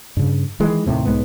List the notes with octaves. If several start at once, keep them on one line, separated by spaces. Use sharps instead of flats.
G2 C#3
D#3 E3 G#3
D#2 A2 C3
B1 G#2 G#3 B3